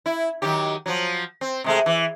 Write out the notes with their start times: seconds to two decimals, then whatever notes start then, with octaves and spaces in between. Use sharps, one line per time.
0.06 E4
0.42 D#3 F#3 G4
0.86 F3 F#3
1.41 C4
1.64 C3 G#3 A3
1.86 E3